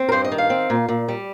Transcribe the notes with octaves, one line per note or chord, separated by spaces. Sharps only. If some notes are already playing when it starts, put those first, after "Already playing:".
Already playing: C4
A#4
G2 C5
D#5
D#3
F5
C4
A#2
A#2
G3